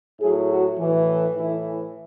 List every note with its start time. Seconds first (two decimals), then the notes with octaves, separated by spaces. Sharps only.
0.20 A2 F#3 G#4
0.49 F#4
0.79 A2 E3
1.37 A2 E3 E4